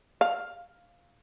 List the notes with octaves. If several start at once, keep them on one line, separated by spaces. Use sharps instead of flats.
F5